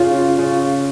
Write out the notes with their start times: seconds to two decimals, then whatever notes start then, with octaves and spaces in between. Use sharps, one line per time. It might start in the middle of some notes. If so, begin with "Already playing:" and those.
Already playing: C#3 F4
0.39 C#3